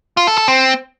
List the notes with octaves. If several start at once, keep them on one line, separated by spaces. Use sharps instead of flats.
F4
A4
A4
C4